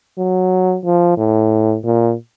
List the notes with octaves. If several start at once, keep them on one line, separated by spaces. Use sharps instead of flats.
F#3
F3
A2
A#2